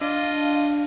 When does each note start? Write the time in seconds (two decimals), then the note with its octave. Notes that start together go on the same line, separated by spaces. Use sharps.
0.01 D4 F4 D#5 F5